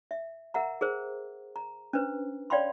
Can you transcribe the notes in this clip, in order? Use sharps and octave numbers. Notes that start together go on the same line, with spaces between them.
E5
A#4 E5 F#5 A#5
G#4 A#4 C5
A#5
C#4 D4 B4 C5
C#5 D5 F5 G5 B5 C6